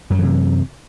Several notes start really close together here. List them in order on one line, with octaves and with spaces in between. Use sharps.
F#2 F#3 E3 C3